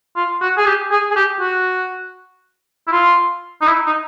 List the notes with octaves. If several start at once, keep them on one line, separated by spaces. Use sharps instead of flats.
F4
F#4
G#4
G4
G#4
G#4
G4
F#4
E4
F4
D#4
E4
D#4